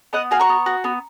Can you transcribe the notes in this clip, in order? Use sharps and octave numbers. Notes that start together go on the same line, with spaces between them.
B3 D#5 F#5
F#4 F5 G#5
A#5 C#6
B3
F#4
B3